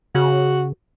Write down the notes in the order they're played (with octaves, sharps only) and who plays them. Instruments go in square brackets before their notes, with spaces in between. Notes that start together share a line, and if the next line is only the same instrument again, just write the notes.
[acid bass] C#3 [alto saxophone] F#4